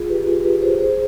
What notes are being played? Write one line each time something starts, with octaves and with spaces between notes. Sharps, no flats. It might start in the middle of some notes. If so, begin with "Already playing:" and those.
Already playing: F4 G#4
G4 B4
F4 G#4
G4 B4
G#4 C5
G#4 C5